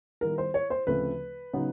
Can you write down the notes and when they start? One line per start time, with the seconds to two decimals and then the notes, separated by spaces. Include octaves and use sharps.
0.21 D#3 G3 B3 E4 A#4
0.38 C5
0.54 C#5
0.70 C5
0.87 D2 C#3 F3 A3 C4 B4
1.53 C#3 F#3 B3 D#4